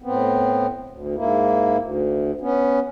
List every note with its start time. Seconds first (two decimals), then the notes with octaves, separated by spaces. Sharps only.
0.02 A2 B3 C4
0.90 D2
1.16 G#2 A#3 E4
1.78 D2
2.41 B3 C#4